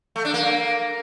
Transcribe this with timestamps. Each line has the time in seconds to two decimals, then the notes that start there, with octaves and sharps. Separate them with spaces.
0.16 A3
0.25 D4
0.34 A#3